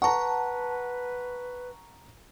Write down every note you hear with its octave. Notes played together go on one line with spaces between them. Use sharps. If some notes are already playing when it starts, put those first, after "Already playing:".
B4 F#5 A5 A#5 C#6